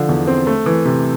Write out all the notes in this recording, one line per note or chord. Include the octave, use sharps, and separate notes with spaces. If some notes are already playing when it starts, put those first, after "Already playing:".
Already playing: D3 F3
E2
C4
A3
E3
C3